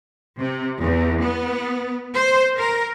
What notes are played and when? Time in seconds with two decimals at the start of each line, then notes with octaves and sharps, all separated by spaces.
0.40 C3
0.81 E2
1.22 B3
2.14 C5
2.57 A#4